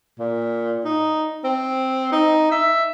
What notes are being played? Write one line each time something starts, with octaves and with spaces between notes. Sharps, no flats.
A#2
D#4
C4
D#4
E5